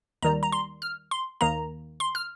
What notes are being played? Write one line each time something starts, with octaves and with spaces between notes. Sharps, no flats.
D#2 D#3 G3 A#5
A#5
C6
F6
C6
D#2 D#3 A#3 A#5
C6
F6